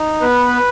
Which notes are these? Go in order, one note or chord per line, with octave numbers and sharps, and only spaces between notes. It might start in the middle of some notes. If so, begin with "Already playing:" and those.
Already playing: D#4
B3 B4